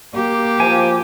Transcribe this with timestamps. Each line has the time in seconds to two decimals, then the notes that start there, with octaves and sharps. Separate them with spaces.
0.15 A#3 G4
0.60 F3 G#5